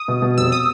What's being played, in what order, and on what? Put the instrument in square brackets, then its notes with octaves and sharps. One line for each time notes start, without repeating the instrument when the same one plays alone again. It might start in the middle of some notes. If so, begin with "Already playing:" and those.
Already playing: [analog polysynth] D#6
[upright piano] B2
B2
[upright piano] F1 [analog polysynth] E6
[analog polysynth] D#6